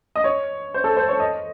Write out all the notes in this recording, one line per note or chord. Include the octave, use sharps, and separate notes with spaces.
D#5
C#5
C5
A4
C5
C#5
D#5